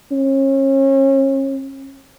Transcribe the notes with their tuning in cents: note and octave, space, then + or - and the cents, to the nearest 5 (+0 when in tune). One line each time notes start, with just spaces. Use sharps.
C#4 -35